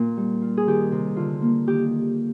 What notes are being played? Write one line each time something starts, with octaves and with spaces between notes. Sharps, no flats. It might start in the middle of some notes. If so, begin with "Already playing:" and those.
Already playing: A#2
G3
F4
G#4
D#3 G4
C3
D3 F4
A#3
D#3 G4